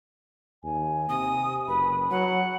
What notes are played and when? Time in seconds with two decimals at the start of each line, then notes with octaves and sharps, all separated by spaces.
0.64 D#2 G#5
1.09 C3 D#6
1.68 F#1 B4 B5
2.11 F#3 F#5